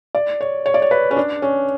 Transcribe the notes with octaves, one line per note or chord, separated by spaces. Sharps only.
D5
C#5
C#5
D5
C#5
B4
C#4
D4
C#4